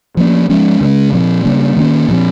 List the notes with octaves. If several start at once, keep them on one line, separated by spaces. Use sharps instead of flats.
F3 A#3 C#4
F3 G#3 C#4
C#3 G#3 C#4
A#2 F3 C4
C#3 G3 A#3 C#4
D#3 A#3 C#4
A#2 F3 C4